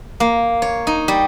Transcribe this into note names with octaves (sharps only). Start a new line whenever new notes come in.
A#3
C#5
D#4
G3